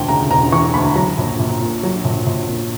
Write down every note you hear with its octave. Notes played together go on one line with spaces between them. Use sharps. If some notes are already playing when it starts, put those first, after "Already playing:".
Already playing: E1 D2 E3 G5
C#3 A#5
E1 A#5
E3 C#6
D2 B5
F#3 A#5
A#1
A#1
A#2
F#3
A#1
A#1
A#2